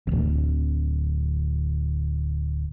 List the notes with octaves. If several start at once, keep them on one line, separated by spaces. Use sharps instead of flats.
D1 G1